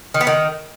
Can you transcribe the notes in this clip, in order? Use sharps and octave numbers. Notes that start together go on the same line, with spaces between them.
D#3
B3
D#3